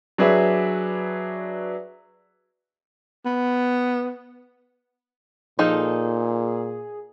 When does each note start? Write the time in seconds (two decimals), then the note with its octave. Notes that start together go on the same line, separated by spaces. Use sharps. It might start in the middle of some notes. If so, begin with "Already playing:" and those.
0.18 F#3 D4 G#4 B4 E5
3.25 B3
5.59 A#2 F3 D#4 G#4 A4